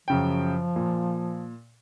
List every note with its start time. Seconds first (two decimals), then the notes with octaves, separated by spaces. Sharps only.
0.08 F#2 C#3 F3 G5
0.76 A#2